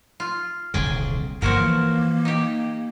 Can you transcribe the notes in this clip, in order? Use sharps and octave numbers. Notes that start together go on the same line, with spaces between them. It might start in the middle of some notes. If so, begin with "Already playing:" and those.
F4
D#1 C2 D3 G#4 G5
G1 G2 B2 F3 A#3 F#4 A#4
E3
D#4 G4